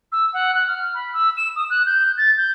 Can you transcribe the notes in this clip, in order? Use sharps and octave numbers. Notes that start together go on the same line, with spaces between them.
E6
F#5
F#6
F6
B5
E6
E7
D#6
F#6
G6
A6
G6